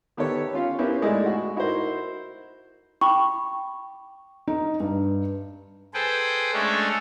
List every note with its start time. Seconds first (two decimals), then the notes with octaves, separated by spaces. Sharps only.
0.17 D#3 B3 G4 A4 C#5
0.53 C#4 F4 F5
0.78 B3 C#4 E4 G4 A#4 C5
1.02 G#3 A3 D#4 E4 D5
1.26 F#4
1.56 D#4 E4 F#4 A#4 C5
3.01 G5 B5 C#6 D6
4.48 D#4
4.80 G2
5.94 G#4 A4 B4 C5 G5
6.53 G#3 A3 C#4 D4 A4 C#5